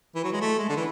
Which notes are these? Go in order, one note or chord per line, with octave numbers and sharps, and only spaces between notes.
E3
F#3
G#3
A3
G#3
D3
E3